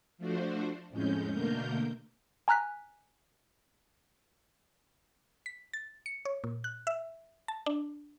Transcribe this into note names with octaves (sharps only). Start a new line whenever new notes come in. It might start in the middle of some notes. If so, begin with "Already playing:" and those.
F3 A3 D4 F#4 C5
F2 A2 G#3 C#4 G6
B2 D3 A3 A#3 A#4 G6
G#5 A#5 F6 F#6 B6
B6
A6
C#7
C#5
A#2
F#6
E5
A5
D4